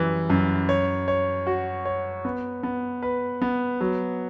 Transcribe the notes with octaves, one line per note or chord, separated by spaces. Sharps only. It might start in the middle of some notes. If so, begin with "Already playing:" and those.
Already playing: F#2 E3 G3
F#2
C#5
C#5
F#4
C#5
B3
B3
B4
B3
F#3